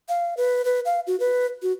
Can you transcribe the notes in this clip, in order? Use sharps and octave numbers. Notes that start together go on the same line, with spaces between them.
F5
B4
B4
F5
F#4
B4
F#4